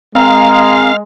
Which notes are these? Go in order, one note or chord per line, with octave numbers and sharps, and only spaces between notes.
G#3 C4 A#4 F5